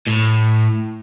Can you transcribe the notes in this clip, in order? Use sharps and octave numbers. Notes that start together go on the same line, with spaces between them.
A2